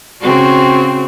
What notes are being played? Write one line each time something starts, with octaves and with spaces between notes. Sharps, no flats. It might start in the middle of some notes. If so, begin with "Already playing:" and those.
C#3 C4 F#4